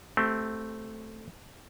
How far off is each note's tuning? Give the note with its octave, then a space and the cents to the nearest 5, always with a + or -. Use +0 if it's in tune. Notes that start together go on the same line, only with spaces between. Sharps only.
A3 +0 C4 +0 G4 -30